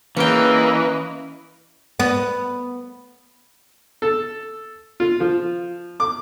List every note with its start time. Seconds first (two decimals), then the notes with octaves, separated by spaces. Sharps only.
0.17 E3 A#3 C#4 B4 D#5 G5
2.00 B3
4.02 A4
5.00 F4
5.20 F3
6.00 D6